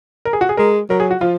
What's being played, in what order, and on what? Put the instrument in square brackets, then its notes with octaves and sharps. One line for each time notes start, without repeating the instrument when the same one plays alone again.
[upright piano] A#4
G#4
F#4
G#4
[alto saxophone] G#3 [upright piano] A#4
[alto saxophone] F#3 [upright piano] A#4
[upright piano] G#4
F#4
[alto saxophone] F3 [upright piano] F4